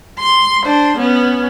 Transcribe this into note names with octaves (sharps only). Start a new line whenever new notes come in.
C6
D4 C5
B3 C#4